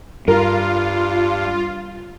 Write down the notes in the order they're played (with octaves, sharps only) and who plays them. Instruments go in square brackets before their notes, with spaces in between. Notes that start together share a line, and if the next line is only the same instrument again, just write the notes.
[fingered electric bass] G2 [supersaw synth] F4 [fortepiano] A#4